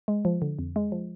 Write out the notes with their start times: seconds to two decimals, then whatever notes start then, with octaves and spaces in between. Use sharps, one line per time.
0.08 G#3
0.25 F3
0.42 D3
0.59 F2
0.76 G#3
0.92 F3